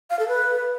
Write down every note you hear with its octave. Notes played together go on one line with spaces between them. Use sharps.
F5
A4
B4